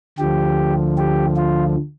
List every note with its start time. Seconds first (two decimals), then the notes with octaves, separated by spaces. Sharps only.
0.18 D2 D3 F3 G4
0.98 G4
1.37 F4